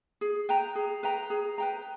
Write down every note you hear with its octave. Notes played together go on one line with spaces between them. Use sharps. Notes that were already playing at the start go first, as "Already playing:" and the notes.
G#4
B4 G5 A#5
G#4
B4 G5 A#5
G#4
B4 G5 A#5